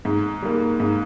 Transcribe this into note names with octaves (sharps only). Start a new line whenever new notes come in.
G#2
G3 A#3
G#2